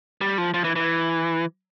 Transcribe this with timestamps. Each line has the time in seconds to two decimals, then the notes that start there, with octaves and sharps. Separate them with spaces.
0.21 G3
0.38 F3
0.54 F3
0.64 E3
0.76 E3